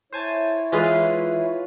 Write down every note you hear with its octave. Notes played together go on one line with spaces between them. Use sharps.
E4 C5 C#5 G#5 A5
E3 G#3 F4 G#4 B4